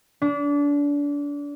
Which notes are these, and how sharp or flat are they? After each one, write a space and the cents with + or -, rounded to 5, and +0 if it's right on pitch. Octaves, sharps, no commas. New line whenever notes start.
D4 -30